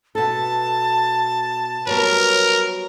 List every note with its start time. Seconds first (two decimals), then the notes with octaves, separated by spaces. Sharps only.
0.15 B2 A4 A5
1.87 F#3 G3 B3 A#4